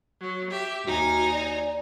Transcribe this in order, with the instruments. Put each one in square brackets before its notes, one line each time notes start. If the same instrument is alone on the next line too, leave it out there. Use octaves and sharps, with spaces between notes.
[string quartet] F#3
G4 E5
[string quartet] D#2 D#4 G#5 [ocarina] F#4
[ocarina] D5